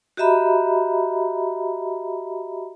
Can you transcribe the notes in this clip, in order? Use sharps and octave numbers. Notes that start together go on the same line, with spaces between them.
F#4 G4 D#5 E5 A#5 B5